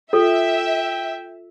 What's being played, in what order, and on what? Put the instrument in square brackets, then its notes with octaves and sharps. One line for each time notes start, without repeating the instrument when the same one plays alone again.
[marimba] F4 [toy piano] A4 [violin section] E5 [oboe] G5